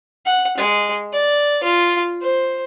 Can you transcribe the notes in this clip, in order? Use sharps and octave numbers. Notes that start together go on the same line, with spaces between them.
F#5
G#3
D5
F4
C5